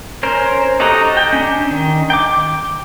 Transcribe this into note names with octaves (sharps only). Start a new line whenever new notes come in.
C#4 A#4 C5
D#4 F#4 G4 A4 A#5
G5
C#4 D4
D#3
G5 D6